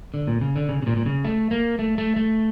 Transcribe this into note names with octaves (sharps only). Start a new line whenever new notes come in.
D3
A#2
C#3
D3
C#3
C#3
A#2
A#2
C#3
A3
A#3
A3
A3
A3